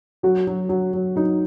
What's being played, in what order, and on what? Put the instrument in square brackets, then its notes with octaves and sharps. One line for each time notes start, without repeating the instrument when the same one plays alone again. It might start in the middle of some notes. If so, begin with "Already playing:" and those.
[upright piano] F#3 F#4
F#3
F#3
F#3
F#3 D#4